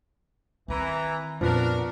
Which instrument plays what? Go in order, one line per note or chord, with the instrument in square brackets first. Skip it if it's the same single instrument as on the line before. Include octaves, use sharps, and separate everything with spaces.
[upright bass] D#3 C4 [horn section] E3 A#5
[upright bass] F2 A#2 [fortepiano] F3 B3 [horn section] D4 F#4 A#4